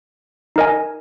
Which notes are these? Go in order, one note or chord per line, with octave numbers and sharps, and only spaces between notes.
D#4 A#4 D#5 G#5